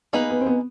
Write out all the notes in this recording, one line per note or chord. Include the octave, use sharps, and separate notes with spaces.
A#3 B3 D#4 G#4 B4
B3
C4
B3